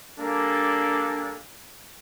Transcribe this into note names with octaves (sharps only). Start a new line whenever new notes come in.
G3 A#3 D4 A4 G#5